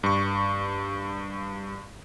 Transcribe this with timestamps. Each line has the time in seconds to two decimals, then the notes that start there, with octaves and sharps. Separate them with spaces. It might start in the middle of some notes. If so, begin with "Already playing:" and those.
0.03 G2 C#6